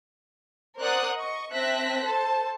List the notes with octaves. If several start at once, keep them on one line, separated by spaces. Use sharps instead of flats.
A#4 C5 D5 F#5 D#6 F#6
D#5 C#6
C4 E5 A5 F#6 A#6 B6
A4 C5 A5